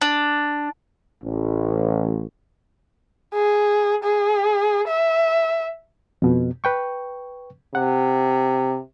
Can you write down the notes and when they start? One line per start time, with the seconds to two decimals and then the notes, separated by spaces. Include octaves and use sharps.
0.01 D4
1.24 A1
3.33 G#4
4.03 G#4
4.87 E5
6.22 F2 B2
6.64 B4 G5 C#6
7.75 C3 F#5